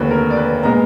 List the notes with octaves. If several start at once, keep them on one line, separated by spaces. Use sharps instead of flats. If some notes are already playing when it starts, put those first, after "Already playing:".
Already playing: F1 D#2 D3 B4
A#4
D5
B4
A#2 G#3 B3 A#5